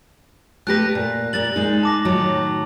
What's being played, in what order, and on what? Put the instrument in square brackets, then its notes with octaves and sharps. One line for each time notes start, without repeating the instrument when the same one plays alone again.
[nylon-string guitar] A3 G4 B4 [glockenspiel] F#6 A#6
[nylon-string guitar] A#2
[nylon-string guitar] A#2 G3 [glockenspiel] A6 F#7
[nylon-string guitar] G#3 D#4
[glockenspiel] A5 D6 A#6
[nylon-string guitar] A2 D#3 F#3